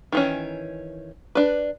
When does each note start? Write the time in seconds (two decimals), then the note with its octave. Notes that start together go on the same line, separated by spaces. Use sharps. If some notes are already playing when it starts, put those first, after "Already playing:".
0.12 D#3 E3 C#4
1.35 D4 B4